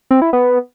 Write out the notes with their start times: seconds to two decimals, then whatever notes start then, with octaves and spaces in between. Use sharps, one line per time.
0.11 C4
0.22 E4
0.33 B3